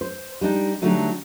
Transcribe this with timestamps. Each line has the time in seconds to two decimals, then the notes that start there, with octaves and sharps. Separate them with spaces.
0.01 C5
0.41 G3 D4 D#4
0.82 D3 F#3 G3 A3 D#4